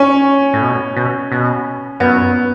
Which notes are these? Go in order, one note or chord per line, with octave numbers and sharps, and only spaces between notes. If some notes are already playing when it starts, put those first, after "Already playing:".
Already playing: C#4
A2
B2
B2
B2
F#2 B3